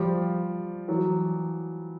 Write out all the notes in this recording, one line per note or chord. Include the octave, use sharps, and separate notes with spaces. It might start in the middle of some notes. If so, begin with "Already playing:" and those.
Already playing: F3 G3
E3 F#3